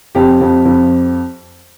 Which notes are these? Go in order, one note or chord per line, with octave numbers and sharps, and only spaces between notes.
F2 G4
F2
F2